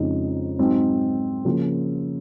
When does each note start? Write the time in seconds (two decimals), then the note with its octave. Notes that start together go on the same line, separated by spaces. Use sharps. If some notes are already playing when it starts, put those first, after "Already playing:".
Already playing: F2 C#3 G#3 C4 D#4
0.58 G#2 F#3 C4 D#4
1.45 C#3 F3 A#3